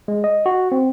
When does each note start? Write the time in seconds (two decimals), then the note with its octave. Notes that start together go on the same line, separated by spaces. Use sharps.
0.08 G#3
0.24 D#5
0.46 F#4
0.72 C4